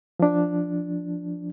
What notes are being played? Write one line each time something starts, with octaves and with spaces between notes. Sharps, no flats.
F3 D4